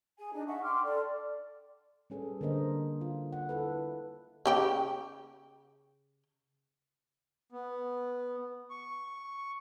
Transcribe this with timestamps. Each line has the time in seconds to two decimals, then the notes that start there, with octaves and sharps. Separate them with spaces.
0.18 G#4 G#5
0.33 D4 D#4
0.47 E5 F#5 C#6
0.64 G5 C6 D6 F6
0.83 A4 D5
2.10 G3 C#4 G#4 A4 B4
2.41 D3 A#3 D4 A#4 C5 D#5
3.01 F4
3.33 F#5
3.49 E4 A4 B4
4.46 C#3 G4 G5
7.52 B3
8.70 C#6